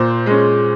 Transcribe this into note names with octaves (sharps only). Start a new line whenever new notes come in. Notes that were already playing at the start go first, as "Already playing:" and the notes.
Already playing: A#2 C5
G#3 C#4